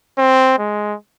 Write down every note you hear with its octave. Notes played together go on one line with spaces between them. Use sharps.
C4
G#3